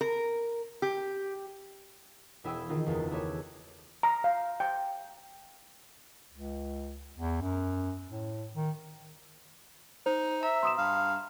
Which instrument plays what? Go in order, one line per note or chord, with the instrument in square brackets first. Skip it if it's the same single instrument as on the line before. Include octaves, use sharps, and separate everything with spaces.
[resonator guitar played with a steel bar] A#4
G4
[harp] E1 E4 G#4 G5 E6
D#3 D#4 F4
F#1 E2 F4 A6
A3 E4 G4 G#4 C#5 E5
[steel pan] A#5
F5
G5
[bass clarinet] C#2
E2
F#2
A2
D#3
[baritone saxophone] D#4 [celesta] C5
[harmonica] E5 [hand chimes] A#5
[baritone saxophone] B2 [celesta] C6 D#6 E7
[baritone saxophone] G2 [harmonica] F5